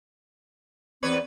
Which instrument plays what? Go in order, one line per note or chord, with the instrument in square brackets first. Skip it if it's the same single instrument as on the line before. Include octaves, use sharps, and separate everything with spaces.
[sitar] E2 B4 C#5 [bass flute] C4